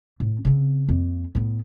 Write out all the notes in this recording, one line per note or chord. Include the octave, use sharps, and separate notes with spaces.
A2
C#3 C4
F2 A#3
A2 B3